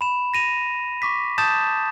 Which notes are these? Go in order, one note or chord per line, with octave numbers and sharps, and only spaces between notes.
B5 E7
A#6 D#7 F7
C#6 D6 B6
A5 D#6 G6 A6 E7